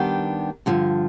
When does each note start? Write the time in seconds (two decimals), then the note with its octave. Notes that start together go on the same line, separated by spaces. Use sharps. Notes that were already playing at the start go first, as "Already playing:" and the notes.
Already playing: D#3 G3 B3 D4 G4
0.66 G2 D3 F3